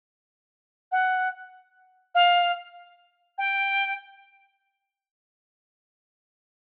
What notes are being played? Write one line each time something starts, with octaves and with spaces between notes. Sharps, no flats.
F#5
F5
G5